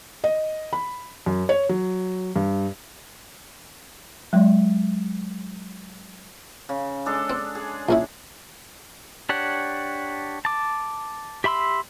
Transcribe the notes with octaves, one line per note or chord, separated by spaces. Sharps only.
D#5
B5
F#2
C#5
F#3
G2
F#3 G#3
C#3
G#3 D4 A4
C4
G#4
A#1 C#4 E4
D4 G4 C#5 F#5
A5 D6
G4 E5 B5 C6 E6